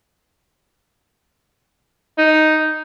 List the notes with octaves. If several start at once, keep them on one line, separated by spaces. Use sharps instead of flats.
D#4